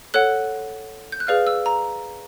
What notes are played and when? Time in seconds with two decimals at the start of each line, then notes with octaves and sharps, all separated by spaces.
0.14 A4 C#5 F#5 F#6
1.12 G6
1.20 F#6
1.27 G#4 B4 D5 F5 F6
1.47 E6
1.66 A#5